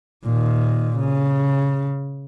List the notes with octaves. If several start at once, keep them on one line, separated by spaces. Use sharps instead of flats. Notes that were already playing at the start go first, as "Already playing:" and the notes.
A#2 D#3
C#3